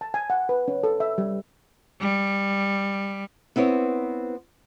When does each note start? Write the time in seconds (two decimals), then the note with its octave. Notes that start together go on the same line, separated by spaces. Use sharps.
0.01 A5
0.14 G#5
0.30 F#5
0.49 B4
0.68 C#4
0.83 A4
1.00 E5
1.18 G3
2.00 G3
3.56 B3 C4 E4 B4 C#5